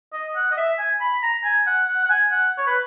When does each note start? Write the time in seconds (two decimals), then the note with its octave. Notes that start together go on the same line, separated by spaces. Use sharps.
0.13 D#5
0.36 F#5
0.51 D#5
0.57 E5
0.79 G#5
1.01 B5
1.23 A#5
1.44 G#5
1.67 F#5
1.88 F#5
2.05 F#5
2.10 G#5
2.32 F#5
2.58 C#5
2.67 B4